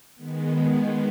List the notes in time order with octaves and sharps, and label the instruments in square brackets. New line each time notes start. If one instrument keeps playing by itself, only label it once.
[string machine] D#3 G#3 B3